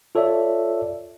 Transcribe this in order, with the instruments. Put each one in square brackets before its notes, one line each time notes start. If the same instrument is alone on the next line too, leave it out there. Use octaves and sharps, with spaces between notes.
[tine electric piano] F4 A4 C#5 D5 E5